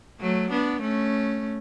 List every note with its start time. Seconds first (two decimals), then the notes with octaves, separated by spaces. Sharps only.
0.20 F#3 A3
0.51 B3 D4
0.81 A3 C#4